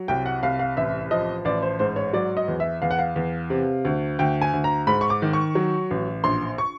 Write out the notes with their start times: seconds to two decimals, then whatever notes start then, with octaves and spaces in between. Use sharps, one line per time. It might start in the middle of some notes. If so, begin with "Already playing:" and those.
Already playing: F#3
0.08 C2 G5
0.26 F#5
0.43 C2 F5
0.59 F5
0.77 A1 E5
1.11 F3 D#5
1.45 A1 D5
1.62 C5
1.79 G#2 C5
1.96 C#5
2.13 F#3 D5
2.37 D#5
2.48 E2
2.60 E5
2.82 E2 F5
2.91 F#5
2.99 F5
3.16 E2
3.50 C3
3.85 D2
4.19 D2 G5
4.42 G#5
4.53 D2
4.64 A#5
4.87 G#2 B5
5.01 C#6
5.10 D6
5.22 D#3
5.33 C#6
5.55 F#3
5.91 A1
6.24 A#1 C6
6.58 C#6